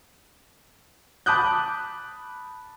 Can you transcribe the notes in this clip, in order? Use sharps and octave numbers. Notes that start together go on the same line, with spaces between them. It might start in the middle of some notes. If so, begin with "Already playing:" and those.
A5 B5 D6 D#6 F#6 G6